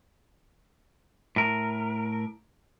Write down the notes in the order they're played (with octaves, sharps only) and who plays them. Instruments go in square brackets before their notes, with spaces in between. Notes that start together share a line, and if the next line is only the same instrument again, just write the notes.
[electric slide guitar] A2 A#4